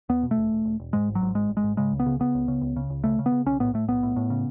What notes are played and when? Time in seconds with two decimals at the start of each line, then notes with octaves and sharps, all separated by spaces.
0.09 E2 B3
0.23 B2
0.31 A3
0.37 E1
0.52 E1
0.65 E1
0.80 E1
0.93 G#2 G#3
1.08 G#1
1.15 F#3
1.21 G#2
1.35 G#1 G#3
1.49 G#1
1.57 G#3
1.64 G#2
1.77 C#3 G#3
1.92 C#2
2.00 B3
2.06 C#3
2.20 C#3 B3
2.35 C#2
2.48 C#3
2.62 C#2
2.76 C#3
2.90 C#2
3.04 C#3 A3
3.19 C#3
3.26 B3
3.32 C#3
3.46 B1 C#4
3.60 A2 B3
3.74 A2 A3
3.88 B1 B3
4.03 A2
4.16 A2
4.30 C#3